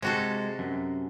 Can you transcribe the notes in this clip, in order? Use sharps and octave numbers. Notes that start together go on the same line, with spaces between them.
C3 G#3 F#4 A4
F#2